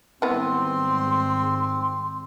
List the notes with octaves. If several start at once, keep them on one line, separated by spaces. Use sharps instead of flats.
G#2 D#3 E3 G3 B3 C4 C6